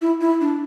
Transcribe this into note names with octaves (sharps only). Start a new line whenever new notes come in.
E4
E4
D4